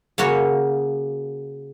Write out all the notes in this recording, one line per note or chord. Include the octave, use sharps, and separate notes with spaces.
C#3 A#3 F#4 C#5